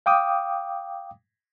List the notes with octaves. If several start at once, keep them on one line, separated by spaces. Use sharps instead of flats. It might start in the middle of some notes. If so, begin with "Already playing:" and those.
F5 G5 D6 D#6